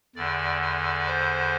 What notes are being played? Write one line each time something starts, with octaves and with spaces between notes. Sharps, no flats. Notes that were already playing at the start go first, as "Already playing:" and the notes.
E2 D3 D5
D5
C5